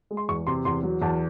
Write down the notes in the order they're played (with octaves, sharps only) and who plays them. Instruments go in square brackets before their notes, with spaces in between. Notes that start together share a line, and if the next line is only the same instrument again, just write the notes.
[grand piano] G#3
C6
E2 C#6
C3 C6
E2 C6
F#3
E2 A5